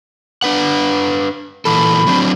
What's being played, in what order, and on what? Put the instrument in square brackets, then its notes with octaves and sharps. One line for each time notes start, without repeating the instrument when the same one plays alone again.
[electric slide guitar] D4 B4 F#5
[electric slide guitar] A#2 E3 A4 [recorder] B5
[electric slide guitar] F#3 C4 D4